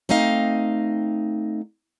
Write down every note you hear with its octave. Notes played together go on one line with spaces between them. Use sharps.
A3 C4 D#4 D#5 F5